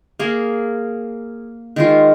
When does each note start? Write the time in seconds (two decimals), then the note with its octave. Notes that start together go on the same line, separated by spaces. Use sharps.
0.19 A#3 G#4
1.76 D#3 G#3 F4